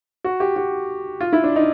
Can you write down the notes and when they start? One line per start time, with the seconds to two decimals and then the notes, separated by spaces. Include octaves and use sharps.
0.24 F#4
0.40 G4
0.56 F#4
1.21 F4
1.33 E4
1.44 D4
1.56 D#4